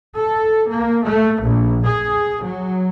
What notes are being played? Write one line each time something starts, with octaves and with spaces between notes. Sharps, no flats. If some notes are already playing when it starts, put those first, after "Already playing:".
A4
A#3
A3
A#1
G#4
F#3